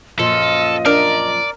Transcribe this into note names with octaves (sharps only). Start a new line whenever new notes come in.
F#2 A#2 F3 A4 D#5
D4 A#4 D5